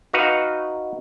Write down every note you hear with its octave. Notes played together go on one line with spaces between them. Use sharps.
D#4 F#4 B4 F5